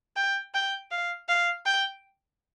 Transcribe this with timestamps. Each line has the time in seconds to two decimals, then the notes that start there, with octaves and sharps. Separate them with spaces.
0.16 G5
0.54 G5
0.91 F5
1.28 F5
1.66 G5